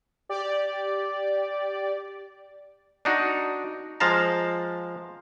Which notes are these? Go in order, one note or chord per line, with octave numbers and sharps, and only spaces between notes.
G4 D5
D4 D#4 F#4
F3 G#3 F5 A5 A#5